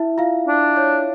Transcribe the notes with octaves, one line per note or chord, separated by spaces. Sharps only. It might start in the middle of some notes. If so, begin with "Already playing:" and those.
Already playing: E4 E5
F4 F5
D4
C#5